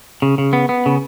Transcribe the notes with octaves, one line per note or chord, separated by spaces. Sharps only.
C#3
C#3
B3
B3
C#3